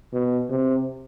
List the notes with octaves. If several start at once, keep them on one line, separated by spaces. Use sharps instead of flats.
B2
C3